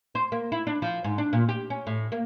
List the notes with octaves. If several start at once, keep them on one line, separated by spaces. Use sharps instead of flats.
C5
A#3
E4
D4
F3
G#2
D4
A#2
G4
C#4
A2
A#3